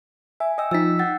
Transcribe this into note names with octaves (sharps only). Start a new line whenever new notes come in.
E5 G#5
D#5 G5 E6
F3 D#4 E6 A6 B6
F#5 G5 A6